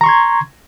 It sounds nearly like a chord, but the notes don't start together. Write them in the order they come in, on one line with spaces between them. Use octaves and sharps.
A#5 C#6 C6 G#6